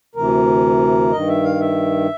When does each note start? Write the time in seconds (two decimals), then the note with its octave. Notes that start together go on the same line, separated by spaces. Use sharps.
0.15 D2 C3 E3 A#4
1.12 G2 D#3 D#5
1.28 E5
1.43 F5
1.60 E5